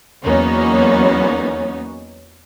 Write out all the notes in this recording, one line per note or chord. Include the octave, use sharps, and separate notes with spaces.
E2 F#3 A#3 B3 C#4 D#4